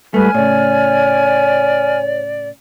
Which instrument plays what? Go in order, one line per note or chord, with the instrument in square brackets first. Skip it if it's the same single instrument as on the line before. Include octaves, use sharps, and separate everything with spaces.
[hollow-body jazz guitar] G#2 A3 [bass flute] G3 [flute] B4 [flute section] G#5 F6
[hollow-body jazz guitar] A2 C#3 [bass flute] C#5 [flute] D5